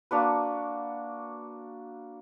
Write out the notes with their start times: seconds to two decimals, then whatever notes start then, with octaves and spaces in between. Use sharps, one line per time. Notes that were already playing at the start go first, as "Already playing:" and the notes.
0.11 A#3 D4 F#4 B4